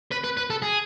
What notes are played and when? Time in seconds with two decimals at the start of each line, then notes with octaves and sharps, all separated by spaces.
0.12 B4
0.24 B4
0.37 B4
0.50 A4
0.62 G#4